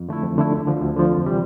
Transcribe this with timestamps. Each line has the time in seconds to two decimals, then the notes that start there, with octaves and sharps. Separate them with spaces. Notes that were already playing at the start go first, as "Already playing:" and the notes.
Already playing: F2
0.09 D3 A3 E4
0.23 F2
0.38 D3 A3 E4
0.52 D2
0.67 D3 F3
0.81 D2
0.97 D3 F3
1.11 F2
1.26 C3 E3 G3